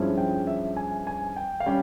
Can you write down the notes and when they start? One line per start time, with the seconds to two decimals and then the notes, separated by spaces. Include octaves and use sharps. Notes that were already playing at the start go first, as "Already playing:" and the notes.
Already playing: G2 F3 G#3 C#4 E4
0.18 G5
0.47 E5
0.76 G#5
1.07 G#5
1.36 G5
1.60 F5
1.66 G3 C#4 G5